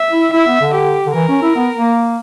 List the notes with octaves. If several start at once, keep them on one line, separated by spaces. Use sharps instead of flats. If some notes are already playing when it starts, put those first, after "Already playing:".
Already playing: E5
E4
E4 E5
B3
D3
G4
D3
E3 A#4
C#4
E4
B3
A#3